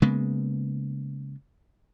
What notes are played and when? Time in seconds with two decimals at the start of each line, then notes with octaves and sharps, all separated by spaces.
0.02 C#3 G#3 A#3 B3